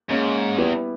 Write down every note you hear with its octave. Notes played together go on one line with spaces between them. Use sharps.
G#2 A#3 C#4 G#4
E2 G3 B3 E4 G4 B4